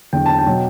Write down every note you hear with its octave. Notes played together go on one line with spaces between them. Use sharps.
E2 D3 F#3 G5
A5
G5
B2 F#3